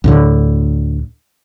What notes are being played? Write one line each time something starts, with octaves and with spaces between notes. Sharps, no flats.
D2 A2 D3